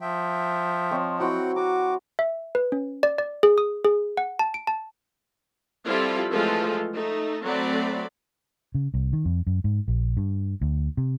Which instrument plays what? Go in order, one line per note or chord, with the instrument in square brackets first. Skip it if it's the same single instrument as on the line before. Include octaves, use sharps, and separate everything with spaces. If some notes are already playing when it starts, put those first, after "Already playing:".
[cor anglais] F3 [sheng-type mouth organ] E5 G5
[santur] C4 C#5 D#5
[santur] F#3 E4 F#4 [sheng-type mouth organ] C4 F#5 G5
[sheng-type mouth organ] F#4 D6 [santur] A#5
[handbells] E5
B4
C#4
D5
D5
G#4
D#6
G#4
F#5
A5
D7
A5
[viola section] F3 G3 C4 E4 F4 A4
E3 F3 G#3 A3 F4 A4
A3 D#4
F#3 A3 C4 D5 B5
[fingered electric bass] C#3
C2
D#3
F2
F#2
G#2
A#1
G2
D2
C3